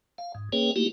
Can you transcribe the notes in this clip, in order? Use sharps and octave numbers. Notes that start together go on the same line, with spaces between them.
F5
G#2
A#3 C#4 G#4 B4 C#5 G5
A3 A#3 D#4 E4 F#4 G4